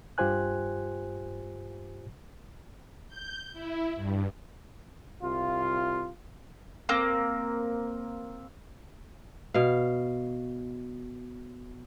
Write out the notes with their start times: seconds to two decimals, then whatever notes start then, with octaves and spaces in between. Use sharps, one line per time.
0.18 G2 F4 G4 C5 G#5 F#6
3.08 G6
3.53 E4
3.95 G2
5.22 C2 C3 F4
6.89 A#3 C4
9.54 B2 F5